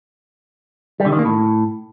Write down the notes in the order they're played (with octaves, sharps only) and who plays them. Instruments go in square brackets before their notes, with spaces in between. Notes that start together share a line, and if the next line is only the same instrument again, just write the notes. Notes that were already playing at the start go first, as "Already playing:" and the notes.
[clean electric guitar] G3
D3
D#3
A#3
A2